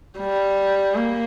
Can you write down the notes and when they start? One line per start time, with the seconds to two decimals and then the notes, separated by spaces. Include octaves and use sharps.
0.19 G3
0.96 A#3